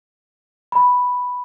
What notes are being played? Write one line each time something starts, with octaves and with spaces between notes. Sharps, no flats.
B5